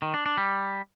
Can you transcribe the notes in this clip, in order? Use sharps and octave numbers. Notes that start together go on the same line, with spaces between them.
D#3
D4
D4
G3